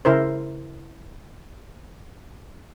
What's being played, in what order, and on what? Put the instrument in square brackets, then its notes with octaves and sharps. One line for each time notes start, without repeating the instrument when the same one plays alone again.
[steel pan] C#3 E4 A#4 C5